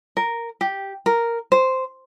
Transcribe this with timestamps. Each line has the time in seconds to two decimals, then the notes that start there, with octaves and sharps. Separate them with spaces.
0.17 A#4
0.61 G4
1.06 A#4
1.52 C5